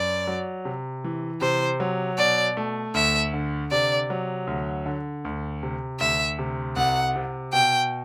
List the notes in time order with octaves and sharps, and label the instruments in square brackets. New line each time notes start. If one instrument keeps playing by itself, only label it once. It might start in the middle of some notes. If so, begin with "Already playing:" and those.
Already playing: [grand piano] F#2 [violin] D5
[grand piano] F#3
C3
E3
[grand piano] C3 [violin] C5
[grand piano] F#3
[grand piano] B2 [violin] D5
[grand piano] A3
[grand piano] D2 [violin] E5
[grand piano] D3
[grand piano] C3 [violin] D5
[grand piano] F#3
D2
D3
D2
C3
[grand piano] D2 [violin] E5
[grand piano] C3
[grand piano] C2 [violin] F#5
[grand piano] C3
[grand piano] B2 [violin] G5